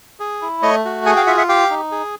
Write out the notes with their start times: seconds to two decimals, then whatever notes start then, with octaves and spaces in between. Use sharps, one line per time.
0.20 G#4
0.42 E4
0.62 A3 C#5 D#5
0.85 F#4
1.06 G#4 F#5 G#5
1.16 F5 G5
1.27 F4 E5 F#5
1.37 E5 F#5
1.49 G4 F5 G5
1.70 D#4
1.92 G#4